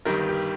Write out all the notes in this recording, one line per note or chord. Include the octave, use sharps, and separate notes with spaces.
G1 G2 D#3 G3 A#4
G4